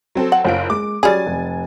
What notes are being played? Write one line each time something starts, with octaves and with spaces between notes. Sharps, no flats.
F#3 C4 A4
F#5
F#1 F4 C5 C#5 F5 D7
G#3 D6
F#3 G3 C#4 G#4 G#5 A6
F1